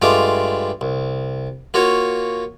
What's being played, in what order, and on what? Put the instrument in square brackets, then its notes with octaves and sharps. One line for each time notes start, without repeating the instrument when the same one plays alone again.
[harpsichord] G2 G#3 A3 F4 F5 D6
C2
A#3 F4 F#4 C#5